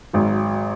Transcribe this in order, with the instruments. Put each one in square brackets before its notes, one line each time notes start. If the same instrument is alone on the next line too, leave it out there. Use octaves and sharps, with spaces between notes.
[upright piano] G#1 G#2 F#3